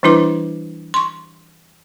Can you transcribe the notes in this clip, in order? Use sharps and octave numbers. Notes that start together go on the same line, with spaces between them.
E3 G3 D4 E4 B4 D6
C6 C#6